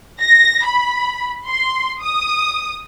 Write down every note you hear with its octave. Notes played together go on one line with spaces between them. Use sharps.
A#6
B5
C6
D#6